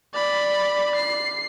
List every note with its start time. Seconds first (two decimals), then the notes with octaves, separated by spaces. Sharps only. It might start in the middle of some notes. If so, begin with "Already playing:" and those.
0.14 D5 B5
0.96 C7